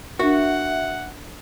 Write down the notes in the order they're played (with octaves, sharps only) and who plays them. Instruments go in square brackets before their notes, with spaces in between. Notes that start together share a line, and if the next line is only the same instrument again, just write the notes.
[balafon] D4 A#4 [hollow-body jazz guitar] F#4 [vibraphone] E5 [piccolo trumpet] F#5